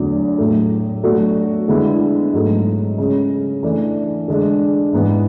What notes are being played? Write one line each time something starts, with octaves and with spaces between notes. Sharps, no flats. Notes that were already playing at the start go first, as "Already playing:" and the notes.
Already playing: E2 D3 F#3 A3
A2 F#3 A3
B2 F#3 A3 D4 F#4
D3 G#3 B3 E4
G#2 F#3 A3
C#3 G#3 C#4
E3 A3 D4
D3 G#3 D4
G#2 E3 B3